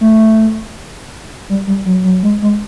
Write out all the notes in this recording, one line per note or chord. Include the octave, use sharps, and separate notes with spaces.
A3
G3
G3
F#3
F#3
G#3
G#3